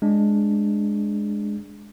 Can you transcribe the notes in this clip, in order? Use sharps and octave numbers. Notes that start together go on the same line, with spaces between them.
G#3 D4